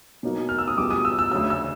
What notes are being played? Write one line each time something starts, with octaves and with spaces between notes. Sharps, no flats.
B2 F#3 A#3 D#4
F6
E6
D#6
C#2 B2 G3 D6
D#6
E6
E6
D2 C#3 F#3 E6
E6